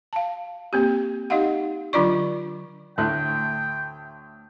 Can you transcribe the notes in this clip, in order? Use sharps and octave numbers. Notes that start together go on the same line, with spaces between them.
F5 A5
A#3 C4 G4
D#4 G4 D#5 F5 F#5
D3 F#3 D4 F4 D5 C#6
D2 A2 G5 F#6